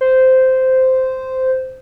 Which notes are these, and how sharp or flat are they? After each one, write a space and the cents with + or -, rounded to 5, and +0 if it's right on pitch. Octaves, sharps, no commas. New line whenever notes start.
C5 -10